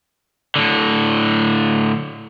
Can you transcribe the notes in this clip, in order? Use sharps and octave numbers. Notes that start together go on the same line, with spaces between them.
A2 D3